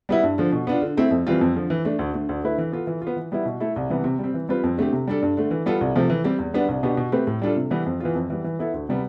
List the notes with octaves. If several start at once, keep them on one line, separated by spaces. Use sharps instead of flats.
G3 B3 E4
G2
D3 F3
B2
B3 D4 F4
D3
A3 C4 E4
F2
E3 G3 C4 F4
F2
D3 F3
E3
A3 D4
D2
D3 A3
D2
D3 A3 E4 B4
E3
B3 F4 A4
E3
F4
B3
E3
G3 B3 E4
B2
A3 E4 A4
C2
C3 E3 G3 B3
C3
G3 C4
E3
G3 C4 F4 B4
F2
D3 A3 C4 G4
C3
G3 D4 A4
G2
D3 A3
E3
G3 B3 F4 A4
C2
C3 F3 A3
E3
G3 C4 G4
E2
D3 G3 B3 D4
C2
B2 B3 D4 G4
B2
A3 C4 G4 B4
A2
G3 D4 F4 A4
C3
E3 G3 B3
F2
E3 B3 F4
F2
E3 G3 B3
E3
B3 E4 A4
D2
C3 G3 B3